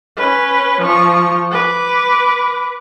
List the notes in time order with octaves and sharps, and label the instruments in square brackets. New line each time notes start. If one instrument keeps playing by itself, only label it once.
[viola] C#4 B4
F3 C#6
B4 D6